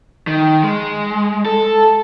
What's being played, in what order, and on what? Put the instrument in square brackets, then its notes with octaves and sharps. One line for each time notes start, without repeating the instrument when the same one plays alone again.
[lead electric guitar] D#3
G#3
A4